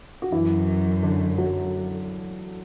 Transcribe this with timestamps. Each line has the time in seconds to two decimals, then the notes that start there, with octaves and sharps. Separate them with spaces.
0.22 F#4
0.32 F#2 E3 E4
1.03 D3 D4
1.38 F#3 F#4